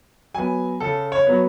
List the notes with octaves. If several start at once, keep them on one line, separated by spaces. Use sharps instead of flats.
F#3 B3 G#5
C#3 A4
C#5
F#3 B3